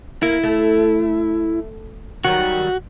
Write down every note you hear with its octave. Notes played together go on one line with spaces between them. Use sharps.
A#3 E4
A3
D#3 F#3 G3 F#4